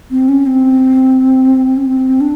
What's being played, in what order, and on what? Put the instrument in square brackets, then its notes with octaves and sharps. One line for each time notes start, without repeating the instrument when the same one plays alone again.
[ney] C4
C#4
C4
C#4
C4
D4